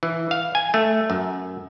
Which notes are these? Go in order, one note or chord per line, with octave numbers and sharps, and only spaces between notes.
E3
F5
G#5
A3
F#2